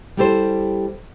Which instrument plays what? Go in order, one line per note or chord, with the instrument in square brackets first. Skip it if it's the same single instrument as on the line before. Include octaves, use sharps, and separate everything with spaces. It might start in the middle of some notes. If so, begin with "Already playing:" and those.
[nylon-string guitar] G3 E4 G4 A4 C5